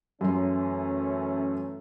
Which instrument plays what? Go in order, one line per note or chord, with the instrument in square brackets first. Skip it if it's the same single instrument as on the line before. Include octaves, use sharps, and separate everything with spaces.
[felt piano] F#2 C6 [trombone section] E3 A3 C#4